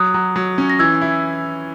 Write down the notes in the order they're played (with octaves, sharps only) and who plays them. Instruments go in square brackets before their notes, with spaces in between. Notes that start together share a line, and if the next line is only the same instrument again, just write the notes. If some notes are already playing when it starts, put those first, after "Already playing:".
Already playing: [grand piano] F#3 [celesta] D#6 F#6
[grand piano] F#3
F#3
C#4
[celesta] A#6
[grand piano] E3 [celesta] E6 G#6
[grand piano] E4